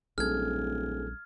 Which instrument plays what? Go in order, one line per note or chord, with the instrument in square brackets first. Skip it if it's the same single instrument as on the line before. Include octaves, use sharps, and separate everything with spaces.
[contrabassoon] D1 [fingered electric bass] A#1 G3 C#4 [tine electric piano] G#4 A4 [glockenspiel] F6 G#6